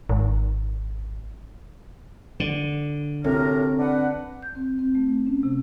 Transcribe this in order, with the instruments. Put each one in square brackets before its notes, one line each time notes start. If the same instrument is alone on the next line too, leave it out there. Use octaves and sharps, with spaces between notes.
[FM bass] G#1
[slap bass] D3
[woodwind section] F#2 C3 A#4 [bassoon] A2 [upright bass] C4
[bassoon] D4 [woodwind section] B4 F#5
[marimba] G6
C4
C4
A3
C#4
C3